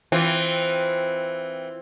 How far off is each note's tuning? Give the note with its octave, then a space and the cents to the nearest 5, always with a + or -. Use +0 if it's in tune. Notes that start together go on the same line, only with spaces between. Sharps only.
E3 +0 C4 +0 F4 +0